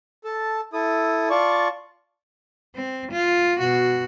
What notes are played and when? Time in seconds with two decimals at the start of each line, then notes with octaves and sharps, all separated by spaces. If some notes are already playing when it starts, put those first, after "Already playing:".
0.24 A4 A5
0.73 E4 A4 D#6
1.30 F4 D5 A5 C#6
2.75 C4
3.12 F4
3.59 B2 F#4